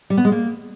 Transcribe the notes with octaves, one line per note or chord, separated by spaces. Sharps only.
G3
B3
G#3
A#3